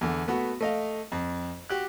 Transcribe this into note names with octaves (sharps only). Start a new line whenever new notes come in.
E2 D3
A3 B3 F#4
A3 D#5 F5
F2
F#4 G4 F#6